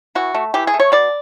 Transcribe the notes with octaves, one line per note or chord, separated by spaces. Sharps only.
E3 F#4
A3
E3 G4
G#4
A3
C#5
B2 D5